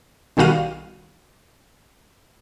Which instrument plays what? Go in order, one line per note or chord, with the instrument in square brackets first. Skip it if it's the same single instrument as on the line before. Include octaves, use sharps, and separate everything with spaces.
[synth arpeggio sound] B1 D#3 G3 F#4 F5 D#7